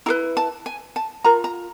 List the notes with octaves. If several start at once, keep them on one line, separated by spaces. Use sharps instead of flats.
E4 G#4 B4 A#5
A5
G#5
A5
F4 A#4 A#5
A#5